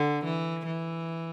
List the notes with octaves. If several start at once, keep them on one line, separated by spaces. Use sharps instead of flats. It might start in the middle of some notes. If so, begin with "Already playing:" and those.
Already playing: D3
E3
E3